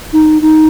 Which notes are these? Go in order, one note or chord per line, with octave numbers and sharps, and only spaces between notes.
D#4
D#4